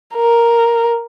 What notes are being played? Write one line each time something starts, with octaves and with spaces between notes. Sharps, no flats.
A#4